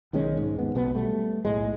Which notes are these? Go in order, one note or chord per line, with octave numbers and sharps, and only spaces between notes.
B1 D#3 G#3 C#4
G#2
D#2 B3
B1 B2 B3
G3 A3
B1 A2 G#3